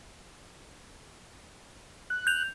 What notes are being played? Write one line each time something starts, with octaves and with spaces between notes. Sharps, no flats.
F#6
G6 F7